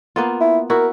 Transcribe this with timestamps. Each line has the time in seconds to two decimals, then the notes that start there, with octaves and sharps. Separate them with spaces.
0.16 A#3 B3 F4
0.41 E4
0.70 E4 F#4 A#4